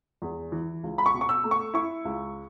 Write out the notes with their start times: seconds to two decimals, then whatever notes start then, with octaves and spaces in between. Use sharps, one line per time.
0.22 E2
0.52 E3
0.84 C#2
0.98 B5
1.06 C#6
1.14 B2
1.21 C#6
1.29 E6
1.44 A3
1.51 C#6
1.74 E4 C#6
2.05 C#2